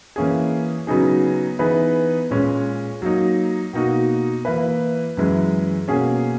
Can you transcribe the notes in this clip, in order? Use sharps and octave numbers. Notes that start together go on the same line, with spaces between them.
E3 A#3 C#4 G#4
C#3 F#3 B3 D#4 G#4
E3 B3 D#4 G#4 B4
A#2 G#3 C#4
F#3 A#3 D#4
B2 A#3 D#4 F#4
E3 A#3 E4 B4
F#2 E3 G#3
B2 A#3 C#4 G#4